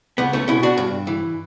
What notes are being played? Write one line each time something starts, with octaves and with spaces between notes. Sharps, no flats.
C#2 B3
A3 C#4
B2 C#4 E4
D4 F#4
G2
E3